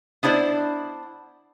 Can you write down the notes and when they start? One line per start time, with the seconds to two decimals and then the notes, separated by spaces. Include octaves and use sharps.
0.23 B3 D4 E4 C5 D5